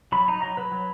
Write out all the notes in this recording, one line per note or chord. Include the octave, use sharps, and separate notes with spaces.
F#3 B5
D#4 A#5
F#3 A#5
F#3 B4
F#3